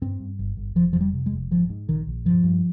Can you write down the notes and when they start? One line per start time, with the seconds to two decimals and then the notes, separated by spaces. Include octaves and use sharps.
0.02 G2 C4
0.20 G2
0.39 G1
0.57 G1
0.75 F1 F3
0.93 F2 F3
1.01 G3
1.13 C3
1.26 G#3
1.32 F1
1.51 G#2 F3
1.70 G#2
1.87 A#1 D#3
2.07 A#1
2.25 G2 F3
2.43 G2